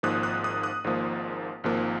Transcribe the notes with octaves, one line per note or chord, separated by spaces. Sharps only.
G#1 G#2 F3 A#3 D#6 F#6
D#6 F#6
D#6 F#6
D#6 F#6
G#1 G#2 F3 A#3
G#1 G#2 F3 A#3